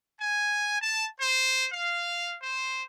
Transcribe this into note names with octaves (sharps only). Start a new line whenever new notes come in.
G#5
A5
C5
F5
C5